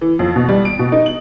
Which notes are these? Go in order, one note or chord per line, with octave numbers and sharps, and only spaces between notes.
E3
F2
B2
G3
D7
B2
D#4
F#7